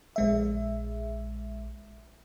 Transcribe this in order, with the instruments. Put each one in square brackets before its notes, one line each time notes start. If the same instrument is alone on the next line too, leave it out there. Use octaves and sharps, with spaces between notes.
[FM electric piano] A#1 G#3 E5